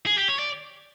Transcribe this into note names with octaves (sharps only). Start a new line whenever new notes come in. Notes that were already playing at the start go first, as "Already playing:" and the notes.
G#4
G4
C#5
D5